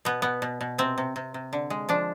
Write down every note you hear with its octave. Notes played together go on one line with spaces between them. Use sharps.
B2 B3
B2 B3
B2
B2
C3 C4
C3
C3
C3
D3
G#3
F3 D4